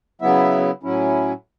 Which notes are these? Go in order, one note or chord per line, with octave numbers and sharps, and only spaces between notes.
C#3 F#3 B3 E4 E5
A2 F#3 C#4 E4